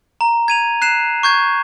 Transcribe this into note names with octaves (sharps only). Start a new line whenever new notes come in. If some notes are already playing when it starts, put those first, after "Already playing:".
A#5
G#6 D#7 F7
F#6 C7 E7
C#6 G6 G#6